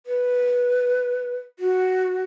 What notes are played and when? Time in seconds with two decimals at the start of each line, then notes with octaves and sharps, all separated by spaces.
0.06 B4
1.59 F#4